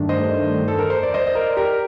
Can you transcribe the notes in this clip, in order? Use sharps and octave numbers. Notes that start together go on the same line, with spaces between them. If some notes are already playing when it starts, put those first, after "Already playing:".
Already playing: G2 D#3 A3 D4
C5 D#5
A4
A#4
C5
D5
C5 D#5
D#5
A#4 D5
G4 A#4